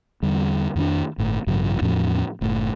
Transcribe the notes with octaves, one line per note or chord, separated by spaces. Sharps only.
E2 D3 G3
F2 D#3 C#4 D4
G1 A2
A1 G2 C#3 F#3
E2 A2 F3 C#4
F#1 A2